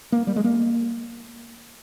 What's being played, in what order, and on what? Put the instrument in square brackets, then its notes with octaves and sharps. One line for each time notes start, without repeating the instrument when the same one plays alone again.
[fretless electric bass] A#3
G3
G#3
A#3